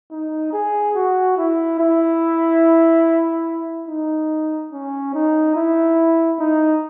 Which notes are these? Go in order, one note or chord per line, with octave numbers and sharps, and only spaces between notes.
D#4
G#4
F#4
E4
E4
D#4
C#4
D#4
E4
D#4